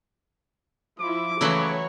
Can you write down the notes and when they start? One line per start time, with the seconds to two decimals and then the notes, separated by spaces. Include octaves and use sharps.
0.98 F3 E4 D6
1.41 C#3 E3 F#3 A3 E4 C#5